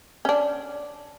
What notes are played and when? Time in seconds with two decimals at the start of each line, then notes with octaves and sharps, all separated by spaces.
0.25 C#4 D4